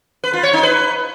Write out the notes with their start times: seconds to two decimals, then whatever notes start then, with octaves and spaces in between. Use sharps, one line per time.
0.24 B4
0.33 F4
0.43 C#5
0.53 D#4
0.63 B4